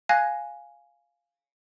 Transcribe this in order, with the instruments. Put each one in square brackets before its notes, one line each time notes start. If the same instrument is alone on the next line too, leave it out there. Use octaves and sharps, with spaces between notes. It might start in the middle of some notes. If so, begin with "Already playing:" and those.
[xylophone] F5 G#5 F#6 G#6 A#6